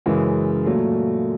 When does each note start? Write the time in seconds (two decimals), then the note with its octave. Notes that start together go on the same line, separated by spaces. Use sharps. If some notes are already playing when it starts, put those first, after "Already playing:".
0.06 F#2 C#3 E3 G#3
0.66 A#2 F#3 A3